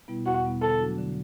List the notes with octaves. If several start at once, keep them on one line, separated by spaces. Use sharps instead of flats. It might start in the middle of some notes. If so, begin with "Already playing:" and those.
B2 G3 B3 E4
E2 F#4
B2 G3 B3 E4
D3 A4
F#3 A3 D4 F#4
D3